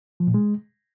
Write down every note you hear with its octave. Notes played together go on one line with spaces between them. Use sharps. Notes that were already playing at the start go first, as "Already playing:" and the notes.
F3
A#2
G#3